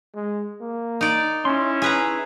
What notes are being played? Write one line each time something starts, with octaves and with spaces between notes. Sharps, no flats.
G#3
A#3
D#4 D5
C#4 E4 C6
G#4 B4 A#5